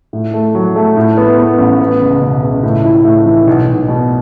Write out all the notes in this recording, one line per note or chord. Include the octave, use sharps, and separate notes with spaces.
A2
A3
F#3
A3
A2
B3
B3
A1
B3
C#2
B2
C#2
A2
E4
A2
E3
B1
B1
B2